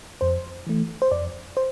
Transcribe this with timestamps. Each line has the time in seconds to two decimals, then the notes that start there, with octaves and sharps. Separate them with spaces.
0.21 F2 C5
0.67 E3 A3
1.02 C5
1.12 F2 D5
1.57 C5